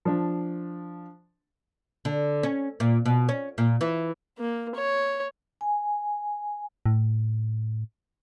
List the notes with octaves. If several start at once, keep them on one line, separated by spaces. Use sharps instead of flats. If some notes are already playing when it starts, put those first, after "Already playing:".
F3 D4
D3
C#4
A#2
B2
C#4
A#2
E3
A#3
C#5
G#5
A2